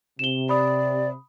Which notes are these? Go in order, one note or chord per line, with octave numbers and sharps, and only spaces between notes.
C3 E7 G7
D5 B5 D#6